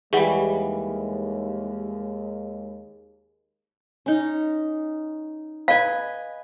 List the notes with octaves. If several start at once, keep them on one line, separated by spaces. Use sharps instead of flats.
D#2 E3 G3 G#3 G#4 F#5
C#4 D#4
B4 D#5 F5 G#5